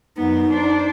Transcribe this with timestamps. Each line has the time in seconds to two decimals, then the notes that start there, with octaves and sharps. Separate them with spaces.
0.17 F#2 B3 D#4
0.49 D4 C5